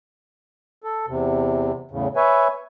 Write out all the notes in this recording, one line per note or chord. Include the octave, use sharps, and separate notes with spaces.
A4
E2 C3
E2 A2 C#3
B4 C#5 E5 G#5